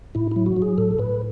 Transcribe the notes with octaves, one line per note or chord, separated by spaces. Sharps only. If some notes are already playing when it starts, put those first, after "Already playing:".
A2 E4
F#3 E4
F#4
F#3
G#4
A2 A4
A2 B4